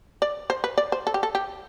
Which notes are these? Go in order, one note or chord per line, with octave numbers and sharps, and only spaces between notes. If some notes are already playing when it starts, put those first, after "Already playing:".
D5
C5
B4
D5
C5
A4
G4
A4
G4